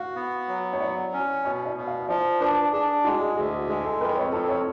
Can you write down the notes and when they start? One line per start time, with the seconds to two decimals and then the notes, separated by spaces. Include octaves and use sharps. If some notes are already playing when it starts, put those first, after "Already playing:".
Already playing: F#4 F5
0.16 B3
0.48 F#3
0.73 C#5
0.80 F#3 D5
1.13 C#4
1.45 B2 C#5
1.66 D5
1.77 B2
1.88 F5
2.09 F3 D5
2.40 D4 B4
2.72 D4 G#4
3.04 G#3 F#4
3.21 G#4
3.36 D2 G#4
3.68 G#3 G#4
3.85 A4
4.00 F2 B4
4.17 C#5
4.32 F2 A4
4.49 C#5